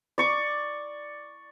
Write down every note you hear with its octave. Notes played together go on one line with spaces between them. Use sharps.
D5 C#6 D6